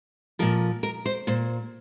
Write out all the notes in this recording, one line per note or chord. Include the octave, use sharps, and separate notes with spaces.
A#2 F3 A#4
A#4
C5
A#2 C5